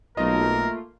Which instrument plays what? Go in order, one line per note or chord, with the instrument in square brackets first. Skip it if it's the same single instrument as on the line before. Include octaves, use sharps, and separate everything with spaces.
[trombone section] B1 [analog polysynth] A3 A#3 F4 [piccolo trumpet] A#4 [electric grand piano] D#5